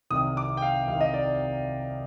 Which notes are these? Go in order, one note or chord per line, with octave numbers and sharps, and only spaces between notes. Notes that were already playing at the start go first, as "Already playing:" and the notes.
C2 C3 D#3 D#6
D6
G5
F5
C2 C3 D#3 F5
D#5
D5